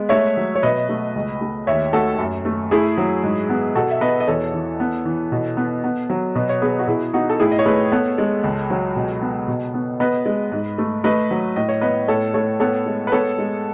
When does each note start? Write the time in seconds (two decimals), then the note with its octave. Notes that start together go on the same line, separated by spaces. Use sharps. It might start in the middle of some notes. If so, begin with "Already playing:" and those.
Already playing: G#3 B3
0.09 A3 C#5 E5
0.37 F#3
0.55 C#5
0.63 B2 B4 D#5
0.89 A3
1.16 C#2
1.41 A3
1.67 D#2 C#5 E5
1.93 A3 F#4 A4
2.19 F#2
2.45 A3
2.71 A3 E4 G#4
2.97 F#3
3.23 G#2
3.50 B3
3.75 B2 F#4 A4
3.90 E5
4.01 B3 B4 D#5
4.20 D#5
4.27 E2 A4 C#5
4.53 E3
4.80 B3
5.05 E3
5.32 B2
5.57 B3
5.84 B3
6.10 F#3
6.35 B2 B4
6.49 C#5
6.62 B3 G#4 B4
6.79 F#4
6.88 B2 E4 G#4
7.13 B3 D#4 F#4
7.29 A4
7.40 A2 E4 G#4
7.52 D#5
7.59 C#5
7.66 A3 G#4 B4
7.92 B3 A4 C#5
8.18 G#3
8.44 C#2
8.70 F#3
8.96 B2
9.22 B3
9.48 B2
9.74 B3
10.00 B3 B4 D#5
10.26 G#3
10.52 G#2
10.78 A3
11.04 A3 B4 D#5
11.31 F#3
11.56 A2 D#5
11.69 C#5
11.81 B3 B4 D#5
12.08 A2 A4 C#5
12.34 A3 A4 C#5
12.60 B3 A4 C#5
12.86 G#3
13.07 B4
13.12 B3 A4 C#5
13.38 G#3